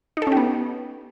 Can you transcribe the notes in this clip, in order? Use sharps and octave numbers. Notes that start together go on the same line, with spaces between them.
B3 C#4 D#4 G4 A4